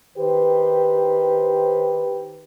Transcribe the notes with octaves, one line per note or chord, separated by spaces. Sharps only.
D#3 G4 B4 C5